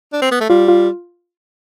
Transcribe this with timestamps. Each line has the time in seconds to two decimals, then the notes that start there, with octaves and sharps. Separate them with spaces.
0.13 D4
0.22 C4
0.31 B3
0.41 A3
0.50 G3 F4
0.68 F4